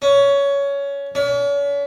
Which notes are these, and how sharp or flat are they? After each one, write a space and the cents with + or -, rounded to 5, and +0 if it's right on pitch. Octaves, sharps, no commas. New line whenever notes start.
C#4 +15
C#4 +40